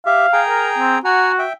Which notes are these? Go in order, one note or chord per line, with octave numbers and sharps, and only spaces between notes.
G4 E5 F5
G#4 G5 A#5
A#4
C4
F#4 F#5 G#5 A#5
E5 G5